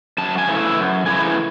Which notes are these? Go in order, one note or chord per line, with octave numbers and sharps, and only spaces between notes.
F#2 A5
G#5
C#3 E3 A3 E4
E5
F#2
C#3 E3 A3 E4 G#5